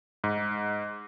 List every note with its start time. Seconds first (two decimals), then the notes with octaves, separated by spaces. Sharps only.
0.24 G#2